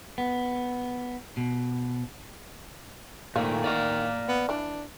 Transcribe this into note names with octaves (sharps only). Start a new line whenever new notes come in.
B3
B2
A#2 D#3 A3 A#3 C5 D5 F5
E3 F#4 D5 F5
B3
E3 D4 B5